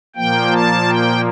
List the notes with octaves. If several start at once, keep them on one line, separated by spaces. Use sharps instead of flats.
A#2 F3 A#3 G5
A5
G5